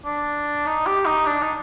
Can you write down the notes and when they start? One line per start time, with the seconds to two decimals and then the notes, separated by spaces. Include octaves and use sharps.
0.05 D4
0.66 D#4
0.86 G4
1.05 D#4
1.26 D4
1.42 D#4